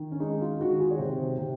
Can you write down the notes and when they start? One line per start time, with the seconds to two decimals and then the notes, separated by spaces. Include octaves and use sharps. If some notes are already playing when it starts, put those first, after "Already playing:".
Already playing: D#3
0.11 C#4
0.20 G#3 D#4
0.41 F4
0.61 D#3 F#4
0.80 G#4
0.91 C#5
0.99 C3 C5
1.38 C3